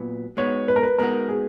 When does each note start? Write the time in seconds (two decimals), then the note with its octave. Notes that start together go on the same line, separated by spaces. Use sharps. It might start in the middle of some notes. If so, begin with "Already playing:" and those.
Already playing: A#2 F#3 B3
0.37 G#3 B3 D#4 F#4 C#5
0.68 B4
0.76 A#4
0.83 B4
0.98 G#3 B3 D#4 F#4 A#4
1.29 G#4